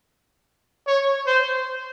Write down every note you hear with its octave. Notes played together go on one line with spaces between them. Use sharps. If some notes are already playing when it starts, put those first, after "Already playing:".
C#5
C5